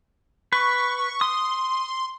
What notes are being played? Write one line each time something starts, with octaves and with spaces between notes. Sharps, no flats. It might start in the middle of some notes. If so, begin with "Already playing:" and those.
B4 C#6
C6 D#6